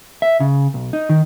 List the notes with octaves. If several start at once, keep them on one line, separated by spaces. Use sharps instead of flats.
E5
C#3
B1
D#4
D#3